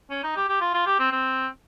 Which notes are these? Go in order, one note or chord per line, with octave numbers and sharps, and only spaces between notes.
C#4
D#4
G4
G4
F4
F4
G4
C4
C4